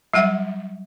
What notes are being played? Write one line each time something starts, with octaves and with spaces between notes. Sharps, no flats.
F#3 G3 E5 F#5